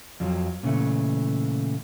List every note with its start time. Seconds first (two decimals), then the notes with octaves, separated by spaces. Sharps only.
0.20 F2 F3 F#3
0.63 A#2 C#3 E3 A3